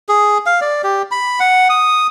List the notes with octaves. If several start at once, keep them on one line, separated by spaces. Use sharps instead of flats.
G#4
F5
D5
G4
B5
F#5
D#6